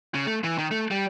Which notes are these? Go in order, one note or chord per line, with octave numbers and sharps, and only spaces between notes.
C#3
A3
E3
D#3
A3
G3